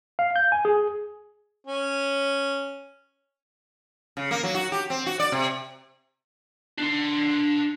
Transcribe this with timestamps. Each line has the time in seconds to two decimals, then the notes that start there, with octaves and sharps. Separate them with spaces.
0.19 F5
0.36 G6
0.52 G#5
0.65 G#4
1.66 C#4
4.17 C#3
4.31 A#3
4.43 F#3
4.55 F#4
4.72 G4
4.90 C4
5.06 F#4
5.19 D5
5.32 C3
6.78 D4 C6